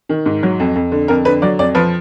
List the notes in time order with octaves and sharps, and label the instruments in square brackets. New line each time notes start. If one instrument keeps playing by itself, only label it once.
[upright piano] D#3
G#2
F#3
F2
F2
D3
F2 A#4
D3 B4
F#3 D5
F2 D5
F3 B4